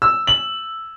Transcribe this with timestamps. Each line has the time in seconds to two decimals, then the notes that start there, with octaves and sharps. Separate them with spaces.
0.02 E6
0.27 F#7